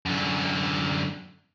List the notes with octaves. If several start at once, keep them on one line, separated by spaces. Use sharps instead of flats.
F#2 D3